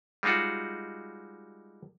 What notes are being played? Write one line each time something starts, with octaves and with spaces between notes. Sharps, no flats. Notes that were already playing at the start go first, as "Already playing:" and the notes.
G3 G#3 D#4 F4 F#4